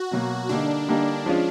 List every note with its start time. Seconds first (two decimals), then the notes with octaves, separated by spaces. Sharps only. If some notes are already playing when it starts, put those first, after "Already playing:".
Already playing: F#4
0.11 B2 F#3 A#3
0.49 D3 G3 A#3 D4 D#4
0.88 D3 G3 A#3 D#4
1.26 F3 G#3 C#4 F4